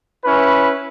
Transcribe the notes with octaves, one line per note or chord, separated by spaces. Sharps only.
C#4 E4 B4